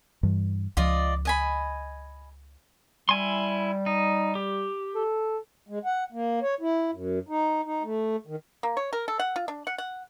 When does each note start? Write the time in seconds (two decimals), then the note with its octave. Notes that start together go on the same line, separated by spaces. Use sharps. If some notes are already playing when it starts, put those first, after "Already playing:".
0.23 G2 E3
0.77 C#2 F3 F4 D5 D#5
1.25 D#5 G#5 B5
3.09 G3 E4 G#5 C6
3.86 D#4
4.35 G4
4.95 A4
5.69 G#3
5.85 F#5
6.12 A#3
6.42 C#5
6.61 E4
6.93 F#2
7.29 D#4
7.65 D#4
7.83 A3
8.27 D#3
8.63 A#3
8.77 C#5
8.93 A#4
9.08 A4
9.19 F#5
9.36 F4
9.48 D4
9.67 F#5
9.78 F#5